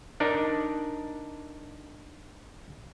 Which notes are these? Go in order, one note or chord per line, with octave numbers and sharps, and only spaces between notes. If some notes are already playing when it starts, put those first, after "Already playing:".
D4 D#4 A#4 D5